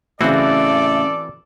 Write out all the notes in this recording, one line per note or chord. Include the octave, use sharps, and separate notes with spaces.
A2 C#3 E3 C4 F#4 A4 D5 E5